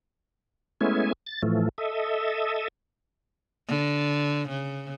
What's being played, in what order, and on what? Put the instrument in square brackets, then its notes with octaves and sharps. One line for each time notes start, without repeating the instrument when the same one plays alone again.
[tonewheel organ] G#3 A3 B3 C#4 E4 G#5
A6
A2 E3 F3 A3
A4 D#5 E5
[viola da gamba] D3
C#3